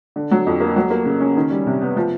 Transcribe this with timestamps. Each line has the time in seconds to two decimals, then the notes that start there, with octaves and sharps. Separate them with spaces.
0.16 D3
0.31 F#3
0.46 F2
0.60 A#3
0.76 F#3
0.90 A#3
1.06 C#3
1.20 C#4
1.37 D#3
1.50 G3
1.67 C3
1.82 B3
1.97 F3